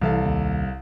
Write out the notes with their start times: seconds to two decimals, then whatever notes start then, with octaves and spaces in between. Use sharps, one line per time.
0.01 C2 E3 A4 F5
0.25 D#2